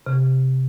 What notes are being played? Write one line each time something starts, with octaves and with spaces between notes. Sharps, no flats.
C3